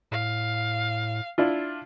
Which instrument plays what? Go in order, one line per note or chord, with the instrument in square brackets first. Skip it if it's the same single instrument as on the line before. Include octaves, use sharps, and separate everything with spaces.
[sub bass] A2 [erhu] F5
[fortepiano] D4 E4 F4